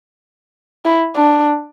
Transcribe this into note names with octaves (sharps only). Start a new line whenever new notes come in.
E4
D4